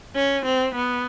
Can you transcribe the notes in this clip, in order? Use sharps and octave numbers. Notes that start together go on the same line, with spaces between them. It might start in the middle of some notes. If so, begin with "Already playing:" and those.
C#4
C4
B3